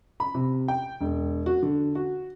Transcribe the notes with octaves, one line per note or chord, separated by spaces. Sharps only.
B5
C3
G5
E1
F#4
D3
F#4